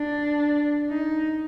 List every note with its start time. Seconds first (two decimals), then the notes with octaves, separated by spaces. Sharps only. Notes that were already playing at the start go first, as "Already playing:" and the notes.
Already playing: D4
0.90 D#4